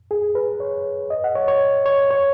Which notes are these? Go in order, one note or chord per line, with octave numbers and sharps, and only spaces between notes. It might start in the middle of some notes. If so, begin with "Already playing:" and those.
G#4
B4
C#5
D#5
F#5
C#5
C#5
C#5
C#5